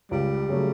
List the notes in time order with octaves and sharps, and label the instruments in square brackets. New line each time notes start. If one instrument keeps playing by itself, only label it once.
[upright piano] C#2 [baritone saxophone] G3
[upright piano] C#3 F#3 A3